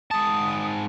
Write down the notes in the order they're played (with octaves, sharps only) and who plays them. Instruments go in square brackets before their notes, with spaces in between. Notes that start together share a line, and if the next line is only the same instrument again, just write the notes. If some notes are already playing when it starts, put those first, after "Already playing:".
[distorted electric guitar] G#2 A5 [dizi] D#6